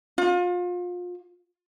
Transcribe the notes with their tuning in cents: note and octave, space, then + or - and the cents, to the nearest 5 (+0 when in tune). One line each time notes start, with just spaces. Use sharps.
F4 +30